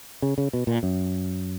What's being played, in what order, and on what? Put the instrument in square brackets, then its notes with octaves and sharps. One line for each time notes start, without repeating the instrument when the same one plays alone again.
[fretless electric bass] C#3
C#3
B2
A#2
F#2